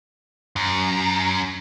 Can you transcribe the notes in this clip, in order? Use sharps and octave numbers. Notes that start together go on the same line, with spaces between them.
F#2